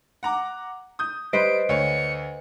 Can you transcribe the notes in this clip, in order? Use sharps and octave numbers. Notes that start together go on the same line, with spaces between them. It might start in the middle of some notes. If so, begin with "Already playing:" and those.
F#5 A#5 D6
D#6 G6
G3 B4 C5 D#5 D7
D2 C#5 C#7